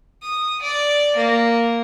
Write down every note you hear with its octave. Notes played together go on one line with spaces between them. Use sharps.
D#6
D5
A#3